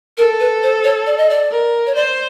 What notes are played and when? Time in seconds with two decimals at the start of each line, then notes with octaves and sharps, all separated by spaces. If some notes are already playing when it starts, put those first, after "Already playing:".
0.18 A4 A#4
0.40 B4
0.63 C5
0.84 C#5
1.06 D5
1.18 D#5
1.30 D5
1.51 A#4
1.87 C#5
1.95 C5 D5